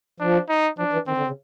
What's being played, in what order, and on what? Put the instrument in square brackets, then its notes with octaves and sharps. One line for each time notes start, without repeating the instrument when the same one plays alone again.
[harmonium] F3 [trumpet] D4
[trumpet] D#4
[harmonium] F3 [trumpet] D4
[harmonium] E3
[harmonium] D#3 [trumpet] C4
[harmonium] D3
C#3